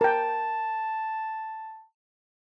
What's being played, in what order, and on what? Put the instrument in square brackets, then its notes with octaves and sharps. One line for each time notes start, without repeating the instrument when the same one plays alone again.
[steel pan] A#4 G5 [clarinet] A5